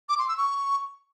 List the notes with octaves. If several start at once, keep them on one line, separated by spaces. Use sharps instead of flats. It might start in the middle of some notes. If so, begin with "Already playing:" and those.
D6
C6
E6
C#6